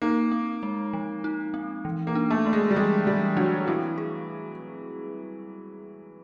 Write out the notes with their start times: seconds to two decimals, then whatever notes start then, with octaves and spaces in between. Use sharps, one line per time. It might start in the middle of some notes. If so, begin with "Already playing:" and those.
0.02 A#3 D#4
0.32 C4
0.63 G#3
0.93 F3
1.24 D#4
1.54 C4
1.85 E3
2.07 A#3
2.15 D4
2.30 A3
2.46 A3
2.53 G#3
2.71 G3
2.76 E3 G#3
3.06 E3 G3
3.37 F#3 D4
3.67 E3 C4
3.98 G#4